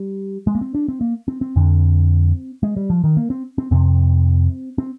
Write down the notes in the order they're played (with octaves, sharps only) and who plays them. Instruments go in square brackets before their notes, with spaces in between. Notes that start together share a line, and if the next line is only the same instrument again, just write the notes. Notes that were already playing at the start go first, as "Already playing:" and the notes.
Already playing: [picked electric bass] G3
G#3
A#3
C4
D4
C4
A#3
C4
C4
F2 D3
G#3
G3
F3
D#3
A#3
C4
C4
F2 C3 C4
C4